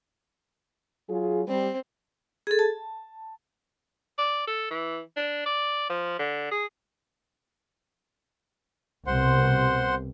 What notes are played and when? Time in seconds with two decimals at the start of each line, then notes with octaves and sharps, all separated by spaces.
1.08 F#3 F4 G#4
1.48 G3 C4
2.47 G#4 A4
2.59 A5
4.18 D5
4.47 A4
4.70 E3
5.16 D4
5.46 D5
5.90 F3
6.19 D3
6.52 G#4
9.07 C2 B2 C5 F#5 C6